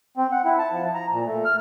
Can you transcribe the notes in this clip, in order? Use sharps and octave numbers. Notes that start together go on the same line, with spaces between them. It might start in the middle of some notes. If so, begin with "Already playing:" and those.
C4
F#5
E4
A5
F3
A#5
A#2
A3
F6